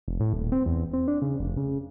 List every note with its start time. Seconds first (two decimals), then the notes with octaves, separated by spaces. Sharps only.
0.08 F1
0.20 A2
0.33 D#1
0.52 C4
0.66 E2
0.93 C4
1.08 D4
1.22 C#3
1.40 F1
1.57 C#3